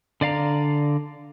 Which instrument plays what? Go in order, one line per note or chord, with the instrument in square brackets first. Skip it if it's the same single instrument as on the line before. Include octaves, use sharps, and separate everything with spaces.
[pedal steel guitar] D3 D5 F5 A#5